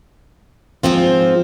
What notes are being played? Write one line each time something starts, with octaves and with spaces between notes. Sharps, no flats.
G#2 F3 C4 F4